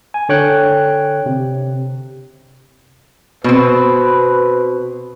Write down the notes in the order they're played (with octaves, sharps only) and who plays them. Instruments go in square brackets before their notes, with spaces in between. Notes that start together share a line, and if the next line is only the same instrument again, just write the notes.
[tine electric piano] G#5
D3 C#5 G5 F#6
C3
[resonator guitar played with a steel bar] B2 C4 [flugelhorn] B4